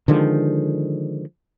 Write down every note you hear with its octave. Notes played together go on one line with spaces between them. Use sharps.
D3 D#3 F3 G#3